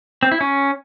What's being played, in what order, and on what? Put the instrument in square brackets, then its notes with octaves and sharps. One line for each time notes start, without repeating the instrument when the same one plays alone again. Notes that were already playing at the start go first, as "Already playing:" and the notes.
[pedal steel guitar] C4
E4
C#4